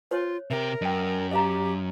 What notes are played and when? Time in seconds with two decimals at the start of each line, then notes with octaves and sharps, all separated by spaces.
0.11 F4 C5 C#5
0.51 C3 G4 A#4 E5
0.82 F#2 D#5 G5
1.31 G4 D#5 F5 A#5